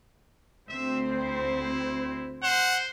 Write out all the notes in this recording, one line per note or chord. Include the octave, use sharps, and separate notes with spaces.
D2 C4 C5 E5
E4
C5 F#5